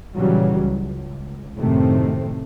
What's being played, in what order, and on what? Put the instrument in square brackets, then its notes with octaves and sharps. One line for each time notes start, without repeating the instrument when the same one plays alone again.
[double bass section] A#2 C#3 E3 F#3 G3
C#2
F#2 A2 C3 D#3 A3 C4